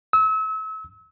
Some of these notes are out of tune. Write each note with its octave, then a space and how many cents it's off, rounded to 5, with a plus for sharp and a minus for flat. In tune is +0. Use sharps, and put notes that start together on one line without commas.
E6 -35